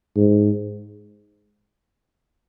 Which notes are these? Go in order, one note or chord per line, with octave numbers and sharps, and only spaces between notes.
G#2